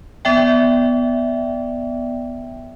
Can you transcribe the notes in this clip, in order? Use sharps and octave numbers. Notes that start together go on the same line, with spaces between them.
B3 D5 E5 G5